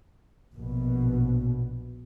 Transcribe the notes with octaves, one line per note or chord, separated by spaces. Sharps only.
A#1 B2